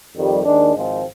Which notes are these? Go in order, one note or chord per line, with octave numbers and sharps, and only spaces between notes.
F2 D#3 G3
D#2 D#3 G#3 D4
G#1 G#2 F3 G#3 C4